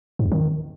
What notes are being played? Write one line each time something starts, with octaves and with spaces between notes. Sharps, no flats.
G#2
E2
D#3